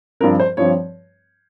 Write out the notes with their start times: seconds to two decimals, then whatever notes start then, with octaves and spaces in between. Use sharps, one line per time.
0.20 G2 F3 C4 A#4
0.40 C5
0.57 G2 F3 C4 C#5